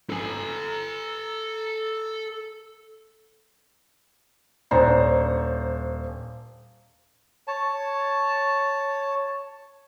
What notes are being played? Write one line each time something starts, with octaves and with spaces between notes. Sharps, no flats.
A4 G#5
D#1 D4 C5 C#5 A#5
C#5 A5